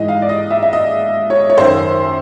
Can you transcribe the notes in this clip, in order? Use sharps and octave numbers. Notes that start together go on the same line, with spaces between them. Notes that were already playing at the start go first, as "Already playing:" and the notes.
Already playing: G#2 E3 D#5
F5
D5
D#5
E5
E5
D#5
C#5
C#5
F#2 D#3 C5